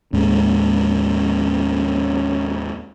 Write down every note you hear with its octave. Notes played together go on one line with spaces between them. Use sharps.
D#2 A2 G#3 C#4